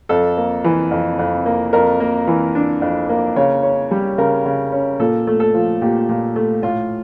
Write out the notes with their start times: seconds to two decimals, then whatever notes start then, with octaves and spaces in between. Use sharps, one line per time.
0.09 F2 A4
0.37 A#3
0.64 E3
0.91 F2
1.19 F2
1.46 A#3
1.73 F2 A#4
2.00 A#3
2.27 E3
2.55 D4
2.81 F2
3.09 A#3
3.36 C#3 C#5
3.63 C#4
3.91 G3
4.18 C#3 A#4
4.45 C#3
4.72 C#4
5.00 A#2 A4
5.27 A3
5.40 A4
5.54 F3
5.81 A#2 G4
6.09 A#2
6.36 A3
6.63 A2 F4